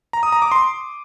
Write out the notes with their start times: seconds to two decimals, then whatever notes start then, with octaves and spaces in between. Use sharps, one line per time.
0.13 A#5
0.23 D#6
0.32 A#5
0.42 D6
0.51 C6